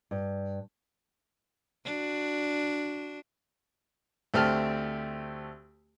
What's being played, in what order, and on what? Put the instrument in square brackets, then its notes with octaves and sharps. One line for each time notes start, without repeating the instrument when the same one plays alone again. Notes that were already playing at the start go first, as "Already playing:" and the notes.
[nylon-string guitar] G2
[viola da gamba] D4 F#4
[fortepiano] D2 A3 C4 G4 A5 F6